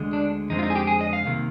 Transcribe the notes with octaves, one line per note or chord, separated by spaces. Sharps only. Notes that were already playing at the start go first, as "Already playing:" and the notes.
Already playing: D2 D3 G#3
D4
F2 D3 G#3 C4 D#4
F4
D#4
G#4
G4
G#4
D#5
F5
C2 C3 D#3 A#3